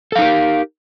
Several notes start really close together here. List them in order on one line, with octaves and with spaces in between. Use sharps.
A4 F5 D#4 A#4 G4